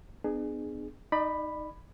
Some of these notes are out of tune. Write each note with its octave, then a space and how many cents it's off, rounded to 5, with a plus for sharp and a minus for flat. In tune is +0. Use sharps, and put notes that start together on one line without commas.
B3 +35 D4 +45 G#4 +0
D#4 +0 D5 +35 B5 +0